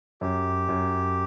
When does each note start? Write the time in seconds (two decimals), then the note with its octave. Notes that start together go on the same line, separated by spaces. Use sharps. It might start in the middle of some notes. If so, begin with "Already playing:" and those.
0.21 F#2 G4
0.69 F#2